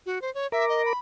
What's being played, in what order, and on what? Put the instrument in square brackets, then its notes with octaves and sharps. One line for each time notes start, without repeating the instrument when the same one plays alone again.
[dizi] F#4
C5
C#5
[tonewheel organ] A#4 A#5 D6 [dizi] E5
[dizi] D#5
B5